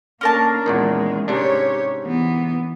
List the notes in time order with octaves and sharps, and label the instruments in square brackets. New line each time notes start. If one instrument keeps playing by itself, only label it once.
[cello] A#3 D4 [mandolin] C#4 A#4 A5
[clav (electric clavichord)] E2 A#2 D#3 [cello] G#3
[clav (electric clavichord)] G#2 C3 D4 [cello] G4 C#5
[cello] E3 B3